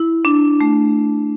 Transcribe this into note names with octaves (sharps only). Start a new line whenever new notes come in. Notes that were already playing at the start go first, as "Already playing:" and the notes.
Already playing: E4
D4
A3